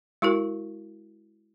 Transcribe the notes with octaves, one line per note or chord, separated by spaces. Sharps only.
G#3 E4 F#4 A#4